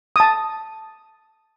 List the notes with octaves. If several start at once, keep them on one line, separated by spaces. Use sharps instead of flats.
A5 D#6